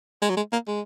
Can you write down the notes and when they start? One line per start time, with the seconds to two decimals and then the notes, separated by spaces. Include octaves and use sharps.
0.22 G#3
0.30 F#3
0.37 G#3
0.53 A#3
0.67 G#3